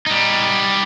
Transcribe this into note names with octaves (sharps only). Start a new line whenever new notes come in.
G3 D#4